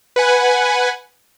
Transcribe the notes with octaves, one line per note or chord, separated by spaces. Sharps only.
B4 F#5 G#5